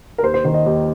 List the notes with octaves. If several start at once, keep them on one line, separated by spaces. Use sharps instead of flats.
A#4
D#2 C5
C5
D#3 C5
D#5
D#2